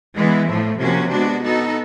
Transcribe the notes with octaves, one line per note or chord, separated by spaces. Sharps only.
E3 G#3 B3 E4
A2 F3 A3
C3 F3 A#3 C#4 F#4
G#3 B3 D4 F#4
B3 D#4 F#4 A4